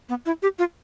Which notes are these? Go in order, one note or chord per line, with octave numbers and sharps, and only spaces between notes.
B3
E4
G4
F4